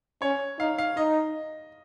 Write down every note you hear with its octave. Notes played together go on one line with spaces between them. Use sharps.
C#4 C#5
D#4 F5
F5
D#4 D#5